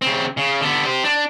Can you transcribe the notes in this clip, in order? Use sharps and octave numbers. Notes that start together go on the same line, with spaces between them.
C#3 C4
C#3
D3 B3
G4 C5
D4